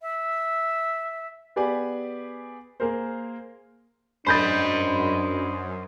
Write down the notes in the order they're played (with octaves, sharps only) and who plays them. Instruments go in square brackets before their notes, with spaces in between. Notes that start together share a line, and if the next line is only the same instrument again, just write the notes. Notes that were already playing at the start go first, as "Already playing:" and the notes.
[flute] E5
[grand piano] B3 G4 G#4 D5 G#5 B5
A#3 G#4 A#4 C5
[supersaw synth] F#2 [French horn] D4 [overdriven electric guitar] C5 D#5 [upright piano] B5 G6 A6